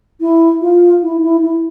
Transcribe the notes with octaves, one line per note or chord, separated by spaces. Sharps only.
E4
F4
E4
E4
E4